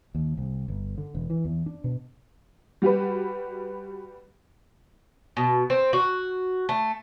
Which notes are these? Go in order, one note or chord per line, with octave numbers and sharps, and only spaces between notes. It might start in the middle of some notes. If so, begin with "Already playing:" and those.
D#2
C2
G1
D3
E1
E3
E2
D4
B2
G3 F#4 G4 B4
B2
C4
F#4
A3